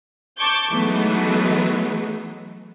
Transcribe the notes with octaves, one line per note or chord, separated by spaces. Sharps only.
A5 C#6 D6 G6 G#6
E3 F#3 G#3 A3 B3 D#4